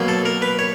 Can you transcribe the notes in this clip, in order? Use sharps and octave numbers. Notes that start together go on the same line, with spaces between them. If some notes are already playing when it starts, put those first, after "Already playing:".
Already playing: B2 F#3 A#3
A4
A#4
B4
C#5